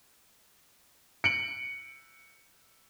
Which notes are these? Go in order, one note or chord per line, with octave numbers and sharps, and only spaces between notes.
C#7 D7 F#7